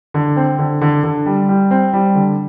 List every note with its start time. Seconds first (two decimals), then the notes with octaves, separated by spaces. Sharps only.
0.14 D3
0.36 C4
0.59 D3
0.81 D3
1.04 D3
1.26 G3
1.49 G3
1.71 C4
1.93 G3
2.15 D3